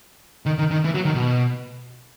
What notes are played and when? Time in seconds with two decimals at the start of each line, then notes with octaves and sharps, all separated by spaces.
0.46 D#3
0.58 D#3
0.71 D#3
0.85 E3
0.94 F#3
1.05 D#3
1.15 B2